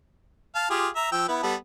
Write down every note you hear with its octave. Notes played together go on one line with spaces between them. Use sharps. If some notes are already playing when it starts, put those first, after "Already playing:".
F5 A5
F4 G4 G#4
E5 A#5
F3 G5 E6
B3 E4 B4
G3 B3 A4